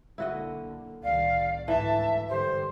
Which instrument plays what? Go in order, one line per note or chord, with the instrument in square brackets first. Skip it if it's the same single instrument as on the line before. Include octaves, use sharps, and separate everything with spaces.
[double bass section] B1 D3 A#3 [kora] E4 F#4 D#5
[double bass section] C2 A2 D#3 [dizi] D5 [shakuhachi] F5
[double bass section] D2 G#2 [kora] E3 [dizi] E5 [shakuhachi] A5
[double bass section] G2 D3 [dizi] G4 [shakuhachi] C5